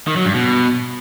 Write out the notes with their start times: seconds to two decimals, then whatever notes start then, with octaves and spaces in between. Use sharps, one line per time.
0.07 D#3
0.16 F#3
0.25 G2
0.34 B2